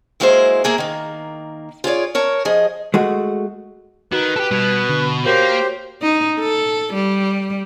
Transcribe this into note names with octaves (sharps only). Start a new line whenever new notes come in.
F#3 G#3 A#3 E4 G#4 C5
A#3 E4 G#4 A#4
D#3 A#3
F4 G#4 C#5 D5
A#4 C#5 A5
F3 G#4 D#5
G#3 A3 F#4
D#3 F#4 B4
G4 A4
B2 G3 G#6
D3
A#3 F#4 G4 A#4 C5 C#5
D#4
A4
G3